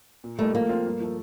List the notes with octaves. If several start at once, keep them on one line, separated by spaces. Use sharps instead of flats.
A#2
G3 A3 A#3 D#4
F3 A#3
C4 F4
G2
F3 A3